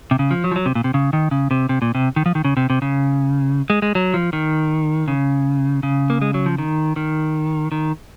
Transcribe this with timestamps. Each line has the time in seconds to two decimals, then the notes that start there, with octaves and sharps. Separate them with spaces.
0.11 C3
0.19 C#3
0.31 F3
0.44 F#3
0.51 F3
0.56 F#3
0.66 C3
0.75 A#2
0.84 C3
0.94 C#3
1.13 D#3
1.31 C#3
1.51 C3
1.69 C3
1.82 A#2
1.95 C3
2.16 D#3
2.26 F3
2.35 D#3
2.45 C#3
2.57 C3
2.70 C3
2.82 C#3
3.70 G#3
3.82 G#3
3.95 F#3
4.14 F3
4.33 D#3
5.08 C#3
5.83 C#3
6.10 A#3
6.22 G#3
6.34 F#3
6.46 F3
6.58 D#3
6.96 D#3
7.72 D#3